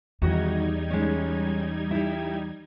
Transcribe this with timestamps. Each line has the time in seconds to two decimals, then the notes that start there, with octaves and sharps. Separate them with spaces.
0.22 E2 D#3 G3 D#4 F#4 D#5 G#6
0.91 G#3 C#4
1.91 E4 G4